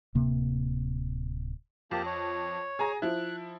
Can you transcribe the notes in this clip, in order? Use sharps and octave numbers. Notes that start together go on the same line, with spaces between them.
D1 C3 A#3
F2 A#3 G4 A5
C#5
G#4 G#5 A#5
F3 E4 F#6